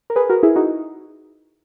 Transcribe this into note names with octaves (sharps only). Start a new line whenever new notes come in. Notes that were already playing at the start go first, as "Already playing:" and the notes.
A#4
G#4 B4
F#4 A#4
E4 G#4
D#4 F#4